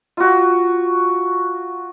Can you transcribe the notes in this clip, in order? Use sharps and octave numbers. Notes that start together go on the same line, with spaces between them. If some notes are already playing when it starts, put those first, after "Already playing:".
F4 F#4